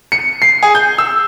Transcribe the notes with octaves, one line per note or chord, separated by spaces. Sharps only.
C#7
C7
G#4
G6
E6